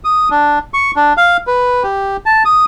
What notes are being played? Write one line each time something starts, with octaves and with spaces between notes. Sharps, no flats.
D#6
D4
C#6
D4
F5
B4
G4
A5
D#6